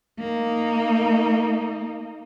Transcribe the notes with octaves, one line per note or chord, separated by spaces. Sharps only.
A#3 D#4